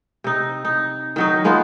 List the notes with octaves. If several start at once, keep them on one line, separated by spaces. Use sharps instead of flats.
C3 D#4
D#4
D#3 F#3 D#4
G#3 A#3 B3 F4